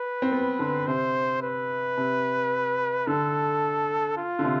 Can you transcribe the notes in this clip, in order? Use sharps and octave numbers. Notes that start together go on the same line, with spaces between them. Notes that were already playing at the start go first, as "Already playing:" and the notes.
Already playing: B4
C4
B3
D3
C3 C5
B4
C3
D3 A4
F4
D3
C3